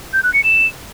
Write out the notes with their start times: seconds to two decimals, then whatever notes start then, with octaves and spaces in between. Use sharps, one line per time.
0.13 G6
0.23 F#6
0.34 C#7
0.44 E7